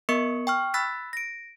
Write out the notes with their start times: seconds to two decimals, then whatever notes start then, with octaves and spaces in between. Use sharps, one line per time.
0.09 B3 A#4 D#5 C#6 C#7
0.47 G5 C#6 F6
0.74 B5 E6 F#6 A6 B6
1.13 A#6 D7